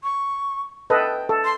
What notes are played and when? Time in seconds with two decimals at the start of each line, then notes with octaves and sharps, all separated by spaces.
0.03 C#6
0.90 A4 B4 D#5 G5
1.29 A4
1.44 C6